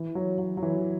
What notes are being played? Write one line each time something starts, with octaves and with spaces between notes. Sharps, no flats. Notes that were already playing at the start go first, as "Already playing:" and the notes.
Already playing: E3
F#3
F#3
F#3
E3